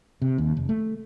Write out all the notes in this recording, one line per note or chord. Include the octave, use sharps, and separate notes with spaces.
C3
D#2
F1
A3